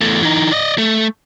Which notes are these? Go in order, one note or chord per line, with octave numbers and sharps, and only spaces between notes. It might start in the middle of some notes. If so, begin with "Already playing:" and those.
E2 A3
E3 D#4
D5 D#5
A3